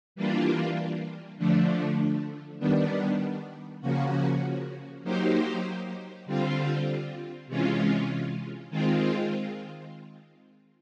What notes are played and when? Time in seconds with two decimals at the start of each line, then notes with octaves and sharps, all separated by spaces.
0.16 E3 G3 A#3 D4 F4
1.38 D3 F3 A3 D4
2.59 D#3 G3 B3 D4
3.81 C#3 F3 A#3 C#4 F#4
5.04 F#3 A#3 D#4 G4 C5
6.26 D3 G3 C4 F4
7.47 C3 E3 G#3 C#4 F4
8.70 D#3 G#3 C4 F4